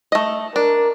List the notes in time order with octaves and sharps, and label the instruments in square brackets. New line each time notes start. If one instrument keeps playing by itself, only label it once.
[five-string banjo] A3 D#5
[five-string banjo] D4 [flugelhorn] A#4